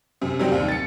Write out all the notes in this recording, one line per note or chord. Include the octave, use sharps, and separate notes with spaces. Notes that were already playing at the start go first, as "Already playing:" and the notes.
F#2 C3
C3 D#3 F#3 G3 C4
D#2
A6 C#7